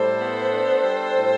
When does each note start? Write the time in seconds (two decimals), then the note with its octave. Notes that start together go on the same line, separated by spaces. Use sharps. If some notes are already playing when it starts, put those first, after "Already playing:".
Already playing: A2 G3 A4 C5
0.21 B3
0.52 D4
0.84 G3
1.16 A2